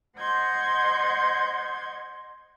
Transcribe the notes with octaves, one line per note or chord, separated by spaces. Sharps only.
C5 D#5 F#5 C6 G6 G#6